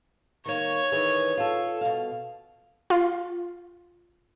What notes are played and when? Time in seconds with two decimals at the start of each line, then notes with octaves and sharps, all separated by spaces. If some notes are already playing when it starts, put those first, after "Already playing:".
0.46 D#3 A#3 C#5
0.92 D#3 E3 G#4
1.37 F4 A4
1.81 B2 F5
2.90 F4